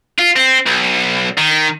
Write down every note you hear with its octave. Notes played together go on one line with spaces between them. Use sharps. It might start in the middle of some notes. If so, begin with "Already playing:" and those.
F4
C4
B1
D#3